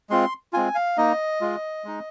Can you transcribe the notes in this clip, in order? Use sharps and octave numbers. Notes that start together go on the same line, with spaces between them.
G#3 C4 F4 C6
G#3 C4 F4 G#5
F5
A#3 D#4 D#5
G#3 F4
G#3 D#4